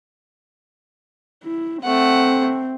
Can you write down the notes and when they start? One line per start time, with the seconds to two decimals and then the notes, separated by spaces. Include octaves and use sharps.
1.44 E4
1.83 A3 C4 F#5